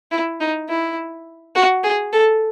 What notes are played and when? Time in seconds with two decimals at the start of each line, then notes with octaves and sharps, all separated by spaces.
0.11 E4
0.40 D#4
0.69 E4
1.55 F#4
1.84 G#4
2.13 A4